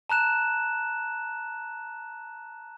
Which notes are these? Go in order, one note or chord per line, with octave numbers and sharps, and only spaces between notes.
A5 A#5 F#6 E7